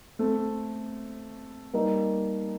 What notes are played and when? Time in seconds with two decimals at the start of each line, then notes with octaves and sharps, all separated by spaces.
0.19 A3 C4
1.73 G3 A#3 D#4 A#4